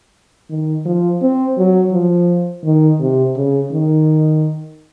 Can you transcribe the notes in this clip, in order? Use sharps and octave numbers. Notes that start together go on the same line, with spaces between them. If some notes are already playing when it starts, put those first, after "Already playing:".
D#3
F3
C4
F#3
F3
D#3
C3
C#3
D#3